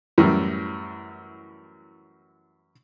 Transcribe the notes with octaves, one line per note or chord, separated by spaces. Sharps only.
F#2 A2 E3 G3